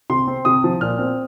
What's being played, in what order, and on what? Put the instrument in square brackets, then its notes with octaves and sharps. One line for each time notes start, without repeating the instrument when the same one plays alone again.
[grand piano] C3 C6
C4
C3 D#6
F3
A#2 F6
C4